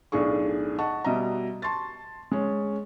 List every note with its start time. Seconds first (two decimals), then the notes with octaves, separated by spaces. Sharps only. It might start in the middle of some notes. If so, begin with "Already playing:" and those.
0.12 B1 A2 D4 G#4 C#6
0.78 D#5 F#5 A5 C#6
1.04 B2 G3 D#5 E5 A#5
1.62 A5 C6 C#6 A6
2.32 G#3 C#4